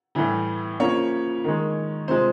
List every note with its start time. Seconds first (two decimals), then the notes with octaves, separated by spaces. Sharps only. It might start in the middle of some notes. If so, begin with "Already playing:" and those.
0.15 A2 E3 G3
0.80 C#3 F3 A#3 C#5
1.44 D#3 G#3
2.08 C3 F3 G#3 C5